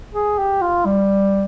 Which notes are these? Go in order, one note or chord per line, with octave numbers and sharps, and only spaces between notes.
G#4
G4
F4
G3